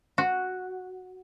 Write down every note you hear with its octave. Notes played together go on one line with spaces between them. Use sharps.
F#4